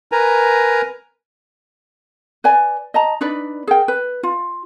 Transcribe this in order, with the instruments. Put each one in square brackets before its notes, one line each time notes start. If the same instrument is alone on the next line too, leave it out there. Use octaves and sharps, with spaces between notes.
[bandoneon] A#4 B4 G#5 A#5
[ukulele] B4 D5 G#5
D#5 A5 A#5
D4 D#4 B4 D5
G#4 A#4 G5
B4
F4